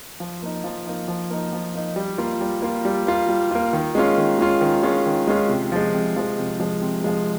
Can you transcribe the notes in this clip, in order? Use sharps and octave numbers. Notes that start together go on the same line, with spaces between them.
F3
A#3 D#4
F3
A#3 D#4
F3
A#3 D#4
F3
A#3 D#4
G3
A#3 F4
G3
A#3 F4
G3
A#3 F4
G3
A#3 F4
D#3
G#3 C#4 F4
D#3
G#3 C#4 F4
D#3
G#3 C#4 F4
D#3
G#3 C#4 F4
C3
F3 G#3
C3
F3 G#3
C3
F3 G#3
C3
F3 G#3